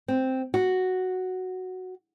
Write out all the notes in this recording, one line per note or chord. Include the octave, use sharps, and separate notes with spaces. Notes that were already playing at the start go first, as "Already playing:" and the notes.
C4
F#4